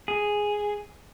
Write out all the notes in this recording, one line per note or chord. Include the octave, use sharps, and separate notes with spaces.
G#4